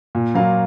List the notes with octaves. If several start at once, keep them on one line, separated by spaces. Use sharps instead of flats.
A#2
F#3 A#3 F4 F5